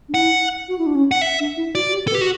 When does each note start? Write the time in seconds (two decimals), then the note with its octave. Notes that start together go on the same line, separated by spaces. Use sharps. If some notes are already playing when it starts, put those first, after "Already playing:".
0.09 D4
0.14 E4 F#5
0.68 F#4
0.78 E4
0.86 D4
0.95 C#4
1.11 F#5
1.21 E5
1.40 D4
1.57 E4
1.74 F#4 D5
1.88 F#4
1.93 G4
2.08 A4
2.11 B4
2.15 G4
2.21 F#4